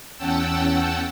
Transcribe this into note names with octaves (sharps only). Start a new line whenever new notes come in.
E2 C#4 F#5 G5 A5 E6